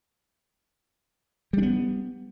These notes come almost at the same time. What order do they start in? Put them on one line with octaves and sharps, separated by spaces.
G3 D4 B3